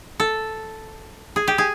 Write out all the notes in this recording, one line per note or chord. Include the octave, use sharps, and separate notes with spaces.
A4
G#4
G4
G#4